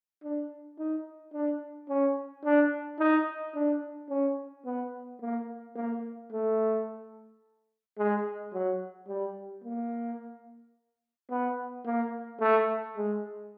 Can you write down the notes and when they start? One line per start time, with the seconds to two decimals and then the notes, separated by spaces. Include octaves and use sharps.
0.23 D4
0.78 D#4
1.33 D4
1.89 C#4
2.44 D4
2.99 D#4
3.54 D4
4.09 C#4
4.65 B3
5.21 A#3
5.76 A#3
6.32 A3
7.98 G#3
8.53 F#3
9.08 G3
9.64 A#3
11.30 B3
11.86 A#3
12.40 A3
12.96 G#3